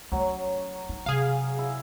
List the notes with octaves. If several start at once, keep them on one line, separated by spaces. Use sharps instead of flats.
F#3 A3 C#4 C#5
D#4
C3 G#4 F5
E4